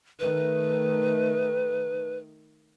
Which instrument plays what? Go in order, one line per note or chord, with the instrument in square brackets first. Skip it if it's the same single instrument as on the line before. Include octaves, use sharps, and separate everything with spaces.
[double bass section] D#3 A3 [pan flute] B4